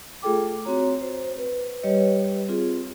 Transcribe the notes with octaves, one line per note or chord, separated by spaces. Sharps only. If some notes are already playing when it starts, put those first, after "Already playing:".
A3 F4 G#4 A4 G5 D6
C4 F#4 C#5 A#5
C5
B4
G3 G4 B4 C#5 D#5
C4 F4 G#4